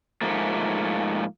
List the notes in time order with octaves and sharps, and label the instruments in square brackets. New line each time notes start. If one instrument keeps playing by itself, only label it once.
[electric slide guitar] G#2 F3 A3 A#3